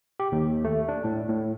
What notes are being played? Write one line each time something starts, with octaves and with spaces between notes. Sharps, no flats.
G4
D#2
A3
D4
A2
A2